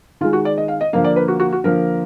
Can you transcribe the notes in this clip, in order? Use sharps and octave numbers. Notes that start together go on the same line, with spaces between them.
D#3 G#3 F4
F#4
D5
D#5
F5
D#5
D3 F3 A#3 F5
D5
B4
F#4
F#4
F#4
D3 F3 A#3 A#4